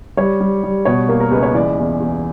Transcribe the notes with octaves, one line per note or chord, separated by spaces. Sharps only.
G3 C#5
G3
G3
B2 C#5
A#3
A#4
C#2 B4
C#5
E3 D5
E2
E2